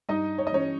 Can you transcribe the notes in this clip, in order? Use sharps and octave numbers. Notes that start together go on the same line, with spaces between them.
G2 D#4 D#5
C#5
D#5
E3 C#4 C#5